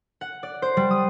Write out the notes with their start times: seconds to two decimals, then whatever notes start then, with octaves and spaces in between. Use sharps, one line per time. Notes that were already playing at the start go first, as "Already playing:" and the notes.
0.21 F#5
0.43 D5
0.62 C5
0.77 G3
0.91 D#6